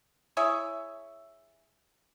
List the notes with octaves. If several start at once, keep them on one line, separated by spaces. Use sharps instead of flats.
E4 G#4 C#5 E5